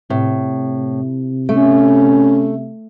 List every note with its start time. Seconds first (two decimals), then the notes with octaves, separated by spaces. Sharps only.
0.10 A2 C3
1.49 A3 C#4